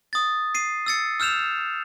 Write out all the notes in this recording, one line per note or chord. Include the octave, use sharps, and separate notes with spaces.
D#6 A6
C7 D#7
E6 A6 C#7
E6 F6 G6 E7 F7